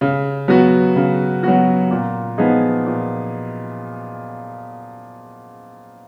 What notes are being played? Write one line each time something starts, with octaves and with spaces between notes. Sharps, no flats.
C#3
F#3 B3 F#4
C#3
F#3 B3 F#4
A#2
F3 B3 D#4 G#4
A#2